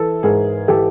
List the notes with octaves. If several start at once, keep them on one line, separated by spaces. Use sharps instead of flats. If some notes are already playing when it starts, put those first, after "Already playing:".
Already playing: E3 A4
G#2 G#4 A#4
E3 G4 A4